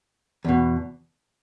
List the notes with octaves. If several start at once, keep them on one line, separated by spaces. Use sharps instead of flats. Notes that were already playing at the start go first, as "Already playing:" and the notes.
E2 B2